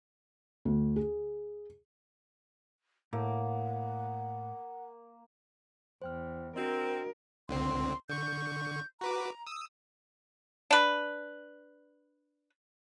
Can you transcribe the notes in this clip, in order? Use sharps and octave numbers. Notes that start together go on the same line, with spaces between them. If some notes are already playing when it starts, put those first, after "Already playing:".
D2
G#4
A2 A#3 F#5
E2 C5 G5 F6
C4 D4 F#4 A#4 D#5
C#2 D3 C4 C6
D3 C#6 G6
F#4 B4 A#5 D6
D#6 E6
D4 B4